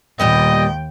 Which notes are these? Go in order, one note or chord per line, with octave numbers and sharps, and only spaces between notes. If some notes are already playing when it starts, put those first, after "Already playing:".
D#2 A#2 G3 B3 D#5 G5